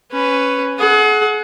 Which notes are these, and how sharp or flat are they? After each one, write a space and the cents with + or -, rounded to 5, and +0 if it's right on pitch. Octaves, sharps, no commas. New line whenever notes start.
C#4 +0 B4 +10
G#4 +40 F#5 +0